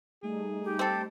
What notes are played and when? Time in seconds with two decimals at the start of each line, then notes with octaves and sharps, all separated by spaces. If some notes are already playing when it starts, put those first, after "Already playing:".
0.23 G3 A3 D#4 G#4
0.64 G4
0.79 C4 A4 C5